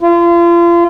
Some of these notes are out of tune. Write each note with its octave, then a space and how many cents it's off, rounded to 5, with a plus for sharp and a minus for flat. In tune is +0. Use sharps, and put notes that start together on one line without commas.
F4 -35